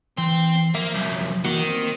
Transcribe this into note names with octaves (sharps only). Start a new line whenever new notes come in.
E3 C4
F3 A#3 E5
C2 F#2
D#3 E3 A#3 F#4
A#3 C4